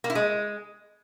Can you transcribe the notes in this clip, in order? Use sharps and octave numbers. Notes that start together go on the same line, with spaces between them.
A#3
E4
G#3